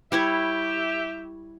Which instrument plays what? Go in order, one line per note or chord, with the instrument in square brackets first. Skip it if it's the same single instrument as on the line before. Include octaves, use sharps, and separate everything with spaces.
[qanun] G3 E4 C#5 [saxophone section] G4 E5